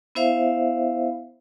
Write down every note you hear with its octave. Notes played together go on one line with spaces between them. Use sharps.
B3 E4 C5 E5 F5